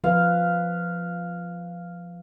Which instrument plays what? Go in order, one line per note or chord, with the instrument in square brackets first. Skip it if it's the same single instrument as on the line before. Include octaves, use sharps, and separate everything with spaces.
[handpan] F3 B4 [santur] F5